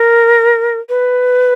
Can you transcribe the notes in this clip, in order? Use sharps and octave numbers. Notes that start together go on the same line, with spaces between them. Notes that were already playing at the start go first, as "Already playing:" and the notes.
Already playing: A#4
B4